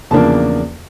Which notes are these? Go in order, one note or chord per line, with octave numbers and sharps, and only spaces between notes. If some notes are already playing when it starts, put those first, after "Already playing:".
E2 C#3 F3 A#3 D4 A5